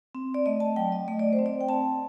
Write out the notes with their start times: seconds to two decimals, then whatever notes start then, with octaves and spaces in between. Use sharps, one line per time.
0.15 C4
0.34 D5
0.46 A3 D#5
0.60 A5
0.76 F#3 G5
0.92 D#5
1.08 A3 D#5
1.19 D5
1.33 C5
1.39 C4
1.46 D5
1.61 G5
1.69 C4 A5